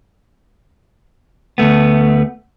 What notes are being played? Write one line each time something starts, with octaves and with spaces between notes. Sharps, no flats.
D2 G2 A3 B3